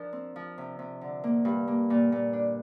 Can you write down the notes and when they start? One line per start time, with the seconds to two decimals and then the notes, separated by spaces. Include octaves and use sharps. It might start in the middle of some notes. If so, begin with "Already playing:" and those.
Already playing: F3 D4 A#4
0.13 C4
0.36 F3
0.58 C3
0.79 C3
1.01 D3
1.24 A#3
1.45 G2
1.68 A#3
1.90 A#2
2.12 A#2
2.33 D4